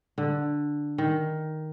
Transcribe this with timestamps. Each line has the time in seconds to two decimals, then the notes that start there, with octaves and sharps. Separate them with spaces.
0.18 D3
0.98 D#3